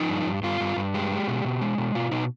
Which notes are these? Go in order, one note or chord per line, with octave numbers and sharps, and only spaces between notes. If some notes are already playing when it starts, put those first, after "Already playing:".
Already playing: F3 D#4
G2
G2
G2 F4
G2
G2
G#3 G4
G#3
B2
B2
G#3
B2
B2 F4
B2 D#4